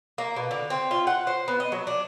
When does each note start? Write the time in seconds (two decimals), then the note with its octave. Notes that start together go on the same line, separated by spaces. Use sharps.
0.18 A#3
0.36 B2
0.51 D3
0.70 C4
0.91 F4
1.07 F#5
1.27 C5
1.48 B3
1.60 D#5
1.72 F#3
1.87 D4